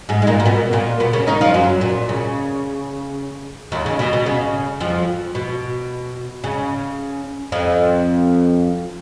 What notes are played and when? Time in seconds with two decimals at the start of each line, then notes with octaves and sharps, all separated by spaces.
0.09 G#2 G#3
0.22 G#3
0.27 A#2 A#3
0.40 A#3
0.45 B2 B3
0.73 A#2 A#3
1.00 B2 B3
1.13 C#3 C#4
1.27 D#3 D#4
1.41 F3 F4
1.54 F#2 F#3
1.81 A#2
2.09 C#3
3.72 D#2 D#3
3.86 C#3
3.99 B2
4.13 B2
4.26 C#3
4.80 F2 F3
5.35 B2
6.44 C#3
7.52 F2 F3